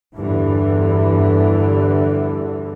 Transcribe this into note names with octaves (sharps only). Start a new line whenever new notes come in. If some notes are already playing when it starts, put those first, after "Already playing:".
E2 G2 D3 E3